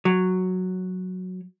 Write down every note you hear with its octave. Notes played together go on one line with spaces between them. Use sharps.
F#3